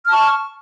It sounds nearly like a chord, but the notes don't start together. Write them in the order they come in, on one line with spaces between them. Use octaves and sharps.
F6 A5 C#6